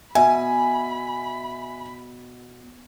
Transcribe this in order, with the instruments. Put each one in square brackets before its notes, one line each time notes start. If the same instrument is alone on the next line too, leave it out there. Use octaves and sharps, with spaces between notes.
[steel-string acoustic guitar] B2 [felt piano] E5 [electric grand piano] G#5 [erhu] B5